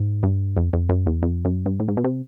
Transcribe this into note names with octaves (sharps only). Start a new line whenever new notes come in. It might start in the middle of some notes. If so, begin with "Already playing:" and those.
Already playing: G#2
G2
F2
F2
F#2
E2
F2
F#2
G2
A2
G#2
B2
C3